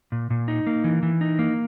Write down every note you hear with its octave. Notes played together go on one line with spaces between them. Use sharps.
A#2
A#2
D#4
A#3
E3
E3
D#4
A#3